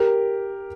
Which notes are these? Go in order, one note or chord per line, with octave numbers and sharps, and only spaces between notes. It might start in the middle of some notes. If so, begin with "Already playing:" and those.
Already playing: G4 A#4